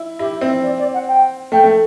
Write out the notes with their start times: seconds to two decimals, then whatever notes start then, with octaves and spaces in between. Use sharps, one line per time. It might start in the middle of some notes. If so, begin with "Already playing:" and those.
Already playing: E4
0.19 E4 G4
0.41 C4 E5
0.63 D5
0.79 D5
0.94 F#5
1.08 G5
1.52 A3 G5
1.64 A3